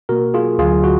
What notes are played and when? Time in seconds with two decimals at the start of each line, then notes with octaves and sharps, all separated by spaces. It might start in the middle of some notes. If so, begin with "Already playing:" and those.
0.09 B2 A#3 F#4 A#4
0.34 F4 G#4
0.58 D2 D3 F#3 F4 G#4
0.84 F#4